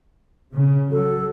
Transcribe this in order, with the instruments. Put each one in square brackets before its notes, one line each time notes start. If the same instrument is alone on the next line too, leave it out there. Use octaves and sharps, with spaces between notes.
[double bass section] C#3
[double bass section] F#3 [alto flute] A4